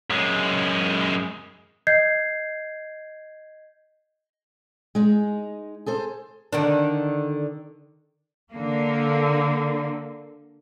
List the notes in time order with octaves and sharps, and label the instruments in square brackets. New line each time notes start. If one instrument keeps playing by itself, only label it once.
[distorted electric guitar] F#2 G#3
[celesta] D#5 G6 G#6 C7
[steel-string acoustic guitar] G#3 D#4
G#4 A4 C5
[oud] D3 D#3 D4
[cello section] D3 A#3